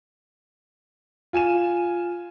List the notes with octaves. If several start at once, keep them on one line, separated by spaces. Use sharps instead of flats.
F4 G#5 D#7 E7